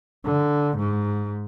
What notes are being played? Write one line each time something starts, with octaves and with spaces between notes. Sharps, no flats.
D3
G#2